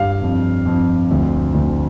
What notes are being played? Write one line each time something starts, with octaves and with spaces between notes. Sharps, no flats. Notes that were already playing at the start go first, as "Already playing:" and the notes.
Already playing: G2 F5
F2
F2
D2
D2